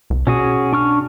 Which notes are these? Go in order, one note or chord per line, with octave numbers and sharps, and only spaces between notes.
C2
B2 C#4 F#4 G#4
D4 C#6 F6